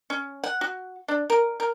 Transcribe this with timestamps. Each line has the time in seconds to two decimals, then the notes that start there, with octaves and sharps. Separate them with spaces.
0.10 C#4
0.44 F#5
0.61 F#4
1.08 D4
1.30 A#4
1.60 A#4